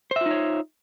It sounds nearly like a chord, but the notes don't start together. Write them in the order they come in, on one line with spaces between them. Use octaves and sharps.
C5 E5 F4 D#4 C#5